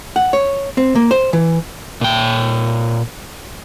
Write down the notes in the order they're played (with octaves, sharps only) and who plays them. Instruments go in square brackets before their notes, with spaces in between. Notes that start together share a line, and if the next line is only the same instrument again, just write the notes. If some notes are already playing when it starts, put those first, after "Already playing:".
[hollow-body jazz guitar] F#5
C#5
C4
A#3
C5
E3
[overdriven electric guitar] A#2 G5